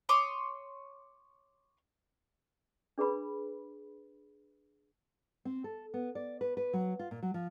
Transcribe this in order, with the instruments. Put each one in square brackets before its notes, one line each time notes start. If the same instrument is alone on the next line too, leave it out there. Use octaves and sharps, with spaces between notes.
[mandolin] C#5 C6 D6 D#6
[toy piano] D4 G#4 B4 B5
[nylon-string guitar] C4
A4
B3
D5
B4
B4
F#3
F4
A#2
F#3
F3